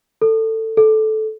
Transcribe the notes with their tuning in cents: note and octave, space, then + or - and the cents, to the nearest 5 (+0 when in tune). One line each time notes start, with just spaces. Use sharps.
A4 +15
A4 -15